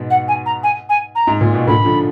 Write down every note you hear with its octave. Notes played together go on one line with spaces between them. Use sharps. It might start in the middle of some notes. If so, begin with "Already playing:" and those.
Already playing: G#2 B2
F#5
G#5
A#5
G#5
G#5
A#5
G#2
A#2
B2
A#2 D3 B5
D3 F3